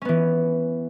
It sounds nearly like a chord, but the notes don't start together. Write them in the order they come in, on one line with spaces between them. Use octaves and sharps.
C#4 B3 E3